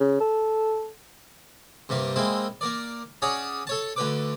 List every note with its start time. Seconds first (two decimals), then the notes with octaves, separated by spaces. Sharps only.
0.01 C#3
0.21 A4
1.89 G2 C3 G3 A#3
2.16 G#3 A#3 C4 E4
2.61 A#3 A#4 D5
3.22 C#4 F#4 G#4 C#5 D5
3.67 A4 C#5 A5
3.96 D2 D3 B4 D6